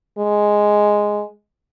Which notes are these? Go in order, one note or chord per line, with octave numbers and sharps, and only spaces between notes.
G#3